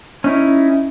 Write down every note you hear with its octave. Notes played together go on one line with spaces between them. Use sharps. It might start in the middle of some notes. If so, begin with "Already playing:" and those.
C#4 D#4 E4